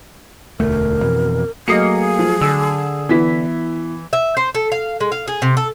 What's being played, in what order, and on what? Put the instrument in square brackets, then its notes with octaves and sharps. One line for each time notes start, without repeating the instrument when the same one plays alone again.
[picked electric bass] E1 D2 A3 [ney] A#4
[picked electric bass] F2 B2 E3
[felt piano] F#3 A3 C7 [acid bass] A#3 [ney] G#4 [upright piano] D#5 D#6 C#7
[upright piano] F3
[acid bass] D3 [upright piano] E6
[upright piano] E3 B6 [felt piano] B3 E4
[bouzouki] E5
C5
A4
F5
G#3
F5
G#4
C3
A4